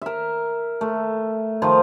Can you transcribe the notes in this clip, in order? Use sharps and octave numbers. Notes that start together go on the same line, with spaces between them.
A#4 E5
A3
D#3 F3 C5